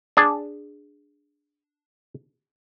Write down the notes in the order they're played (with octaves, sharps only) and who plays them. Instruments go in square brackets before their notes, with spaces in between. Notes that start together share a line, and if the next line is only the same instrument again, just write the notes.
[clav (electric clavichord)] D4 G#4